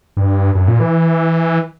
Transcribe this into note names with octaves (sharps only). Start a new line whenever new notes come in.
G2
F#2
A#2
E3